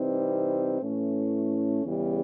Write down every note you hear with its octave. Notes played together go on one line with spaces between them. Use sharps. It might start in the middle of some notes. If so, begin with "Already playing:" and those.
Already playing: C3 E3 G3 C4 D#4
A2 E3 A3 C#4
E2 C#3 E3 G3